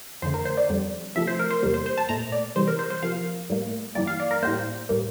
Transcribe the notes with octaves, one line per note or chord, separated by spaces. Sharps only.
F2 D3 A3 C5
A#4
C5
D5
F2 D3 G3
C3 F3 A3 E5
C5
A#4
C5
E2 C3 G3 A#3
C5
C5
A5
A#2 A3 A#5
D5
C3 E3 G3 C5
A#4
C5
C5
C3 F3 A#3 F5
A2 G3 A#3
G2 E3 G3 A#3 D5
F5
D5
A#4
A2 G3 A#3 C5
A2 G3 A#3